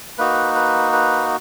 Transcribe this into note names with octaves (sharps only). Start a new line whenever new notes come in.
A#3 D#4 F#4 B4
B4
B4